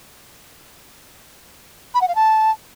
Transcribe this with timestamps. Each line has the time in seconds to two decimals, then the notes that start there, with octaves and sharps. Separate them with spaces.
1.94 B5
2.01 F#5
2.08 F5
2.15 A5